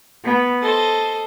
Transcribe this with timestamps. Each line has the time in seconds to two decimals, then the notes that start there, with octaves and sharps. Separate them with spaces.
0.24 B3
0.62 A4 C5 D#5